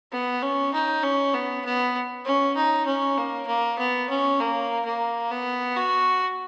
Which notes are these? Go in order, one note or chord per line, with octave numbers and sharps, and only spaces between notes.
B3
C#4
D#4
C#4
B3
B3
C#4
D#4
C#4
A#3
A#3
B3
C#4
A#3
A#3
B3
F#4